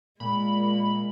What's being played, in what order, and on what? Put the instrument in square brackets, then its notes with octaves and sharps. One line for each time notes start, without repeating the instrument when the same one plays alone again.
[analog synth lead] A#2 [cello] G#3 [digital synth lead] B5